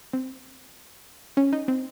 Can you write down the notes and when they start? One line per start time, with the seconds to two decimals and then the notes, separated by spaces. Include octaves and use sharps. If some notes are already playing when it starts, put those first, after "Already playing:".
0.13 C4
1.37 C#4
1.53 D#4
1.68 C4